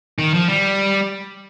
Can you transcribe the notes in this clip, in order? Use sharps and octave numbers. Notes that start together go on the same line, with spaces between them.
D#3
F3
G3